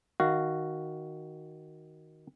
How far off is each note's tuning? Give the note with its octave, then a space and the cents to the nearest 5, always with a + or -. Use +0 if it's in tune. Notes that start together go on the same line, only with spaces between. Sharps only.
D#3 +0 F#4 +0 F5 -15